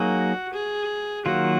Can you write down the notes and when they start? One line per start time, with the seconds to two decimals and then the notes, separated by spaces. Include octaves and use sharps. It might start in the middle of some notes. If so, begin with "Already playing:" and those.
Already playing: F#3 A#3 D#4 F#4 G#4
0.53 G#4
1.26 D#3 F#3 A#3 F4 F#4